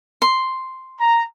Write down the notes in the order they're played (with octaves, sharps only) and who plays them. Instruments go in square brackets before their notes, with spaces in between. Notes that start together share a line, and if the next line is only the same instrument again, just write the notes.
[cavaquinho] C6
[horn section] A#5